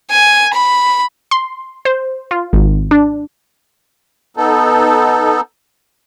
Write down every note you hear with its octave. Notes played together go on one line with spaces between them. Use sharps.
G#5
B5
C6
C5
F4
G#1
D4
B3 D#4 A4